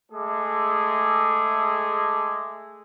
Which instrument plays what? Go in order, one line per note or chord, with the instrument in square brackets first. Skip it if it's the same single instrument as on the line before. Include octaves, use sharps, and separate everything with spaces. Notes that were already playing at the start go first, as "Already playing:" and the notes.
[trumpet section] G#3 A3 G#4 A4 E5 D6